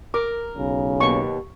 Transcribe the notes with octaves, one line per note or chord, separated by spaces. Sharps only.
A#4 D6
B1 C#3
D#2 B2 C#6